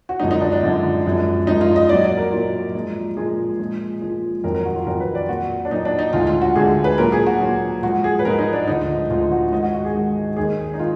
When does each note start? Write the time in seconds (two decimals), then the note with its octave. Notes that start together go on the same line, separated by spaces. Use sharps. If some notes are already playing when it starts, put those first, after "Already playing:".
0.09 F#4
0.20 F#2 D3 F3 G#3 D#4
0.31 D#4
0.41 D4
0.52 D4
0.63 F#2 D3 F3 G#3
1.05 F#2 F3 G#3
1.47 F#2 F3 G#3 D#4
1.61 F4
1.76 D#5
1.89 A#2 F#3 D5
2.04 D5
2.17 A#4
2.32 A#2 F#3
2.74 A#2 F3 G#3
3.16 A#2 F3 G#3 G#4
3.59 A#2 F3 G#3
4.01 A#2 F3 G#3
4.44 F2 D#3 F#3 A#4
4.55 A#4
4.65 F#4
4.76 F4
4.87 F2 D#3 F#3 A#4
5.00 B4
5.15 D5
5.29 A#2 F#3 F#4
5.65 D4
5.70 A#2 F#3 D#4
5.85 D4
5.99 D#4
6.13 D2 D3 G#3 F4
6.27 F4
6.42 F#4
6.56 D2 D3 G#3 G#4
6.84 B4
6.98 A#2 F#3 A#4
7.12 G#4
7.26 F#4
7.40 F#3
7.45 A#2
7.83 G#2 F3 G#3 F#4
8.04 G#4
8.19 B4
8.25 G#2 F3 G#3 A#4
8.39 D#4
8.53 D4
8.67 D2 D3 F3 G#3 D#4
9.10 D2 D3 F3 G#3 F4
9.32 F#4
9.52 G#2 D#3 G#3 D#5
9.63 F#4
9.74 F#4
9.85 G#4
9.94 G#2 D#3 G#3
10.36 D#2 D#3 G#3 G#4
10.74 D#4
10.79 D#3 F4